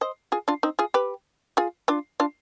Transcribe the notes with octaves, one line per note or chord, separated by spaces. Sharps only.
C5 D#5
F4 G#4
D4 F4
C4 D#4
F4 G#4
G4 B4
F4 G#4
D4 F4
D4 F4